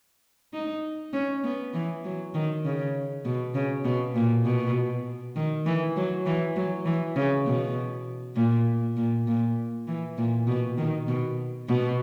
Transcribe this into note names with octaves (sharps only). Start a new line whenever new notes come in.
D#4
C#4
B3
E3
F#3
D#3
C#3
B2
C#3
B2
A#2
B2
D#3
E3
F#3
E3
F#3
E3
C#3
B2
A#2
A#2
A#2
E3
A#2
B2
D#3
B2
B2